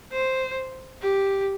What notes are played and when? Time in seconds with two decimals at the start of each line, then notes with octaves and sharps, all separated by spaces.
0.13 C5
1.02 G4